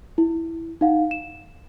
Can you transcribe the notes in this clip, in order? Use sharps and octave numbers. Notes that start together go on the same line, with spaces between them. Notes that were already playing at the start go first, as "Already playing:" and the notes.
E4
D#4 F5 F#5
E7